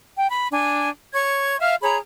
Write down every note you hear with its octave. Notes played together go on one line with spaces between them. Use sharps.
G5
B5
D4 G#5
C#5 C#6 G#6
E5 F5 F6
G#4 C#5 A#5 B5